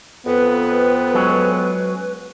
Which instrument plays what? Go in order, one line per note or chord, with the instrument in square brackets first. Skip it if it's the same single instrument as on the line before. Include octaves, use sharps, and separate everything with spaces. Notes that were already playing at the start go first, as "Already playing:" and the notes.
[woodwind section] F2 [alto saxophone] B3 [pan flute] B4
[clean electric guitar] F#3 G#3 C#4